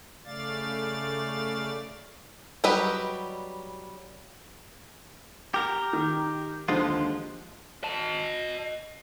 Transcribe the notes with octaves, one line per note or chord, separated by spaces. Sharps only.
C#3 A3 D5 F5 A6
F#3 G3 G4 B4 D#5
G4 A#4
D#3
D#2 D3 F3 G#3 F4
D#5 A5